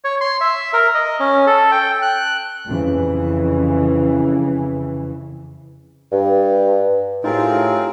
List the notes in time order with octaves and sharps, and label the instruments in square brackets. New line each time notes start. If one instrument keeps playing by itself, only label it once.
[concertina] C#5
C6
E5
A#4
D#5
C#4
A4
G5
F#6
[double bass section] F2 C#3 E3
[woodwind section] G2
[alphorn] A2 [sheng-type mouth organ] C4 G#4 A#4 [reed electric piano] D#4 G4 [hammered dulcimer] F4